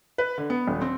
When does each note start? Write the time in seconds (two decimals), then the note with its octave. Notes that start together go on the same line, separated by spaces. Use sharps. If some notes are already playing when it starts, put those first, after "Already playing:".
0.18 B4
0.38 D3
0.50 B3
0.68 D#1
0.81 C4